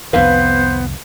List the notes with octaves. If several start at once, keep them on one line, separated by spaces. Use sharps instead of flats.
C2 F2 D#3 B3 B4 C5 F5